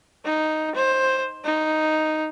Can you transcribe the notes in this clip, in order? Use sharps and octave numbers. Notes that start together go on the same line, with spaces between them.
D#4
C5
D#4